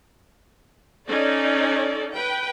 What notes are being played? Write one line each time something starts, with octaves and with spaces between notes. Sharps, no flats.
C#4 D#4 A4 D5
B4 G5